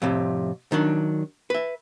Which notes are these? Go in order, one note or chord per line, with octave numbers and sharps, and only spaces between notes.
F2 A2 C3
D#3 F#3 D4
B4 E5